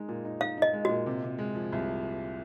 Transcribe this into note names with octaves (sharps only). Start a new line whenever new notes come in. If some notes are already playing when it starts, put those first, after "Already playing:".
Already playing: G#3 D#4
A#2
D#4
D#4 F5
D#4 D#5
G#3
A#2 F#4
C3
C3
G#3
F3
C2